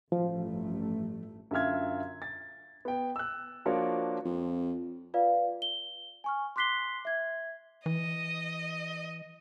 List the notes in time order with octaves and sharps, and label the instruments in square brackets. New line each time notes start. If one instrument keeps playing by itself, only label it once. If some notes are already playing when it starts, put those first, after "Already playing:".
[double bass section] A1 G2 A3 [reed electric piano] F3
[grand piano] F#2 D3 F4 E5 F6 G#6
A6
B3 G5
E6 F#6
F3 A#3 D4 F#4 C#5 D5
[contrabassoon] F2
[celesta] F4 B4 D5 F5
G7
G#5 C#6 F6
C6 D6 F#6 B6 C7 G7
E5 G#6
[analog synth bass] E3 [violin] D#5